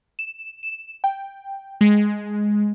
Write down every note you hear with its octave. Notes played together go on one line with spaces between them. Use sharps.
E7
E7
G5
G#3